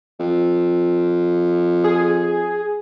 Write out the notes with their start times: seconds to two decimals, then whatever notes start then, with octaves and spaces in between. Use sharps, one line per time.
0.20 F2
1.84 G#4